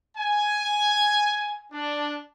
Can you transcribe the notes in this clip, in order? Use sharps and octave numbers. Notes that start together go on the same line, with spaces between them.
G#5
D4